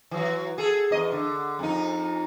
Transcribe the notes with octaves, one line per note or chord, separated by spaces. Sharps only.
E3 F#3
G#4 A4
E2 D#5
D3
F2 D#4